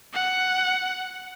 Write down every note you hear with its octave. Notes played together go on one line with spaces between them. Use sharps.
F#5